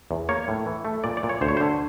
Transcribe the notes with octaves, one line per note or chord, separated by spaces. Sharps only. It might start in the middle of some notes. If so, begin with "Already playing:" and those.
E2
A#3 C#5
A2
E3
A3
A#2 D5
D5
A#2
C#5
D2 C5
C#5
D3 C5